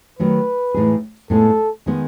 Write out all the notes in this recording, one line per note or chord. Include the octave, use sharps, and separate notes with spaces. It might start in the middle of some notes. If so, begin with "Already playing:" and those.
D#3 F#3 A3 B4
A2 E3 G#3 D#4 G#4
A2 G#3 B3 D#4 A4
D#3 G#3 B3 D#4